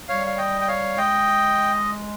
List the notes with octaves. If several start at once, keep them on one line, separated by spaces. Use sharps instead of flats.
G3 C#5 F5
F5
D#5 G5
G5
C#5 F5
G#3 D#5 G5